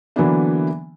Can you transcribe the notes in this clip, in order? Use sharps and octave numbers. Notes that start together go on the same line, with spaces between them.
D3 E3 F#3 A#3 B3 D4